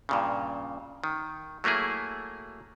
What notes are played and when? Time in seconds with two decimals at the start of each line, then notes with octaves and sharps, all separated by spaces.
0.09 G2 A#2 C#3
1.04 D#3
1.64 F#3 A3 A#3 E4 G#4